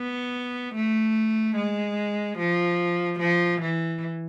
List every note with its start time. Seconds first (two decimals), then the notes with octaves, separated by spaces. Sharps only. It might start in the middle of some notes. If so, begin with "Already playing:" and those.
Already playing: B3
0.74 A3
1.56 G#3
2.38 F3
3.19 F3
3.61 E3